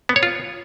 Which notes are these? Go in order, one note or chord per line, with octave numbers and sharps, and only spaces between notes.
B3
C#5
F4